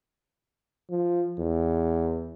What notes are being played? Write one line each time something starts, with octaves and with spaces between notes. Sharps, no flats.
F3
E2